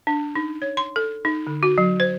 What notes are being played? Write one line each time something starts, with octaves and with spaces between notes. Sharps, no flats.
D4
D#4
C#5
C6
A4
D#4
D3
F#4
F#3
C5